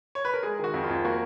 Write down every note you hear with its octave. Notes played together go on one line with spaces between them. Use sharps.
C#5
B4
A#4
G#3 G#4
D#3 F#4
F2
F4
F2
A#3 F#4